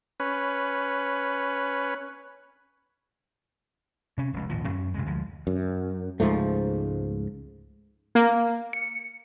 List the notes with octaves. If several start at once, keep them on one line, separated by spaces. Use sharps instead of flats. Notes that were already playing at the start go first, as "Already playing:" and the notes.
C#4 B4
C3 C#4
F1 C#2
G#1 D#2 A#2 F3
F#2 C#4
B1 C3 G#3
D2 F3 G#3
F#2
C#2 G#2 F3 A3
A#3
C#7